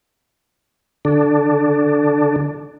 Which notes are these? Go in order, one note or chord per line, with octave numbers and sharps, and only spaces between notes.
D3 D4